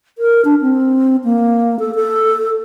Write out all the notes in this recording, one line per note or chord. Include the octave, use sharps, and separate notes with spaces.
A#4
D4
C4
A#3
A4
A4